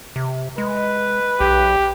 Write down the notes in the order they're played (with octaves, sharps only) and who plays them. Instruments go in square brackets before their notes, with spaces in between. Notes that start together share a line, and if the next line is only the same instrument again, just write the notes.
[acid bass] C3
[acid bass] G#3 [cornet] B4
[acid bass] B1 [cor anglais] G4